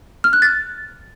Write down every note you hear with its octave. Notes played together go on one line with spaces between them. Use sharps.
F6
F#6
A6